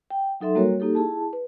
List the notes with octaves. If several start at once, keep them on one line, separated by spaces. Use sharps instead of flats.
G5
F#3 D#4 A4 E5 C6
G3 A#3 F#4 A#4 C#5
A#3 D#4 G4 A4
E4 G#4 A5
B4